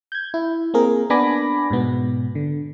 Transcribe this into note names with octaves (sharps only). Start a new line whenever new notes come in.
G6 G#6
E4
A#3 C4 G#4 A#4
B3 D4 G#5 B5 D6 A#6
G#2 B2 B3
D3